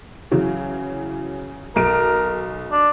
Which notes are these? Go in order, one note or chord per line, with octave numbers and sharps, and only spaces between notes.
C#3 E3 F#3
B1 A#4 D7
D4